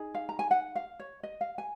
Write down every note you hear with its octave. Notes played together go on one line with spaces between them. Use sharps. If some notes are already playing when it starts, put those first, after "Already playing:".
Already playing: D#4 G#4
F5
A#5
G#5
F#5
F5
C#5
D#5
F5
G#5